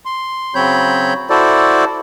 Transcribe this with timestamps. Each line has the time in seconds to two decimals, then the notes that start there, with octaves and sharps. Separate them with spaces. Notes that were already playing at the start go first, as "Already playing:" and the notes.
0.05 C6
0.55 C#3 F#3 C4 C#5 B5 G6
1.30 E4 F#4 A4 C5 D5